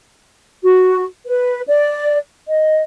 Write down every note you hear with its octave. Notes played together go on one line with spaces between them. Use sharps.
F#4
B4
D5
D#5